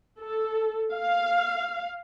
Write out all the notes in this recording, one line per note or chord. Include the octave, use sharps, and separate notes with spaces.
A4
F5